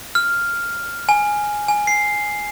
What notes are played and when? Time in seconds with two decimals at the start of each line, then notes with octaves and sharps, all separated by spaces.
0.15 F6
1.09 G#5
1.68 G#5
1.87 C7